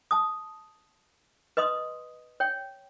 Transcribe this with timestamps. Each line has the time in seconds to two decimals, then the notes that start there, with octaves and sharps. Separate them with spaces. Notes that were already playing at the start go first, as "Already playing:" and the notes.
0.11 A5 D#6
1.57 B4 D#5 C6 D#6
2.40 C#5 G5